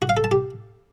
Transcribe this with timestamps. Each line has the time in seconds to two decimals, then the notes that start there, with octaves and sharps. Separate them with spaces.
0.02 F#4
0.09 F5
0.17 A4
0.24 A5
0.31 G4